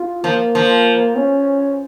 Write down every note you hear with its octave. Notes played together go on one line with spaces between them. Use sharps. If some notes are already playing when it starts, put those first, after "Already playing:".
Already playing: F4
F3 A#3
F3
C#4